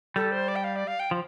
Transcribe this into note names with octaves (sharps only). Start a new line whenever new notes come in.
G3 A4
C5
D5
G5
F5
D5
F5
G5
F3